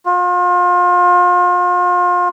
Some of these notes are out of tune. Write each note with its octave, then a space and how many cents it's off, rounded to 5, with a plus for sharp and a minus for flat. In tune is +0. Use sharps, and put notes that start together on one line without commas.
F4 +35